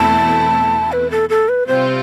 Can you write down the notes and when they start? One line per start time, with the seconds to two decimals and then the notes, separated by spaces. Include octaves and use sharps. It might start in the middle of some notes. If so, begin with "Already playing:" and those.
Already playing: E2 B2 A3 C4 E4 A5
0.92 B4
1.11 A4
1.30 A4
1.49 B4
1.67 C3 G3 C4 F4 C5